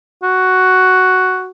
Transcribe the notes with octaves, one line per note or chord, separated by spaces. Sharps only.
F#4